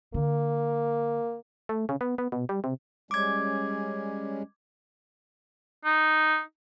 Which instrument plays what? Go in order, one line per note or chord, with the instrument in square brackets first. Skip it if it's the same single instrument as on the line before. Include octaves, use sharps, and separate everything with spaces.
[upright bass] D3 [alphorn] A#3
[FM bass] A3
C#3
B3
B3
B2
G3
C3
[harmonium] G3 G#3 C#4 [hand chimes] D6 G#6
[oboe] D#4